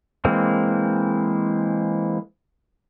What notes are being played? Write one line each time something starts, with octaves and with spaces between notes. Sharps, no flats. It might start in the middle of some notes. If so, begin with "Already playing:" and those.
E3 G#3 A#3 C4